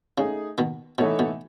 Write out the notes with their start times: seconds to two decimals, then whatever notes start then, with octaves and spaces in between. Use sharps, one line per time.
0.18 C#3 A3 D#4 G#4
0.58 B2 D#3
0.98 B2 E3 A3 D#4 A4 C#5
1.19 B2